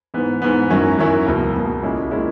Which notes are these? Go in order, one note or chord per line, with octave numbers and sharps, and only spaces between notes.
G#2 E3 B3
G#2 E3 B3
F#2 D#3 F#3 C#4 E4
F#2 D#3 F#3 C#4 E4
C#2 B2 A#3
C#2 B2 A#3
B1 A#2 G#3 C#4 E4
A#2 G#3 C#4 E4